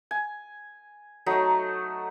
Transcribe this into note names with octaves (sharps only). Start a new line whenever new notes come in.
G#5
F#3 A3 D#4